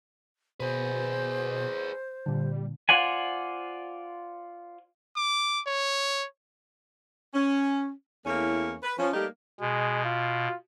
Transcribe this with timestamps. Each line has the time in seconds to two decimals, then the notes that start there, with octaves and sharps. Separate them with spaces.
0.60 B2 G#4 B4 C5
2.26 A#2 D3 G3
2.89 F4 C5 D5 F#5 G#5
5.17 D6
5.67 C#5
7.34 C#4
8.26 E2 A3 A#3 C#4 E4 C#5
8.83 B4
8.99 F3 C#4
9.14 G3 A3 A#3 D#4 G4
9.61 B2 G#3
10.04 F4